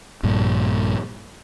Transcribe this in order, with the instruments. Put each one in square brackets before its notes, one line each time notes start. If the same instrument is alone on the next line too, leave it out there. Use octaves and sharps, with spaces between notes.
[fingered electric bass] A#1 G2 A#2